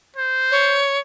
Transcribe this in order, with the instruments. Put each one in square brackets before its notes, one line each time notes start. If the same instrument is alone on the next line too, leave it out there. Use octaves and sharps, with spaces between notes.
[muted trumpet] C5
[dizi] C#5